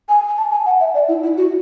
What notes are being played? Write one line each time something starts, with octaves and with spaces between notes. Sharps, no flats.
G#5
A5
G#5
F#5
E5
D5
E4
E4
F#4